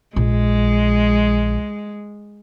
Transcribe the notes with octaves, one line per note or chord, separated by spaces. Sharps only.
A#1 G#3